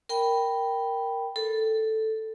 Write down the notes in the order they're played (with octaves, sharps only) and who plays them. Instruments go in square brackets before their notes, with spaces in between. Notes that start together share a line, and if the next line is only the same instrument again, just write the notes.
[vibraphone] A#4 G5 B5
A4